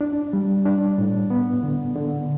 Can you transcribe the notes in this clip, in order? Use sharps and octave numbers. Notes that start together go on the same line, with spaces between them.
D4
G3
D4
A2
B3
D3
D3